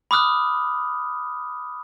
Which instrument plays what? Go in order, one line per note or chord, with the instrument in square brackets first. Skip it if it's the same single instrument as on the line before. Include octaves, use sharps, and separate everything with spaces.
[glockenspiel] B5 D6 D#6 F6 F#6